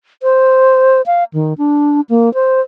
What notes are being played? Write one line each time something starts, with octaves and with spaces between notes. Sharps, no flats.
C5
F5
D#3
D4
A#3
C5